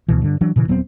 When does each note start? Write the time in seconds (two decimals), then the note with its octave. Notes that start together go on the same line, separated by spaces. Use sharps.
0.08 D2 B2 E3
0.22 G2 D3
0.41 E3 F#3 D4
0.56 A#2 C#3 E3
0.68 D#1 F#3 B3 C4